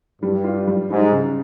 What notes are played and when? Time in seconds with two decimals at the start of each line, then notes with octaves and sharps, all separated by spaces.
0.22 G2 G3
0.44 F4
0.67 G3
0.89 G#2 G3
1.12 C#3